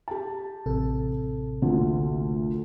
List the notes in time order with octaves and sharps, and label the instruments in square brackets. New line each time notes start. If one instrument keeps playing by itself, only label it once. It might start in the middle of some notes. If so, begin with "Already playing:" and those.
[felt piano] G4 A5
[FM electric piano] A1 C3 A4
[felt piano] D2 A#2 D3